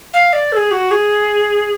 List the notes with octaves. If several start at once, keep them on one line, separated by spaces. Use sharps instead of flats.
F5
D5
A4
G#4
F#4
G#4